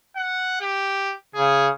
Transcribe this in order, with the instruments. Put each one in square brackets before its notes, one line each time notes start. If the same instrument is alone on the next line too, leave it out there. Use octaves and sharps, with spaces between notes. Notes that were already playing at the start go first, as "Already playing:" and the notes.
[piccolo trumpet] F#5
G4
[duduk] C#3 [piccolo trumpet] G#4